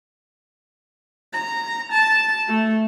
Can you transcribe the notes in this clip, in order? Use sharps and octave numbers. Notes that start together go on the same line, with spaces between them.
A#5
A5
A3